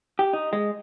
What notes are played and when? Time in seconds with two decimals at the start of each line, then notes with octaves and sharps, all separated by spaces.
0.19 G4
0.33 D#4
0.53 G#3